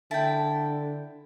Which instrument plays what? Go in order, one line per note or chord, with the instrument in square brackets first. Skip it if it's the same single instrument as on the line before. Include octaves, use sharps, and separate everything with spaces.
[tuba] D3 [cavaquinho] E4 G5 [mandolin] A5